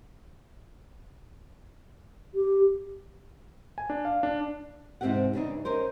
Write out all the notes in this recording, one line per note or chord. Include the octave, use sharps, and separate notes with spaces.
G4
G#5
D4
F5
D4
E2 G#2 C3 C4 G4 F#5
G2 C#3 E3 G#3 D4 D#4
C#4 D#4 A#4 C5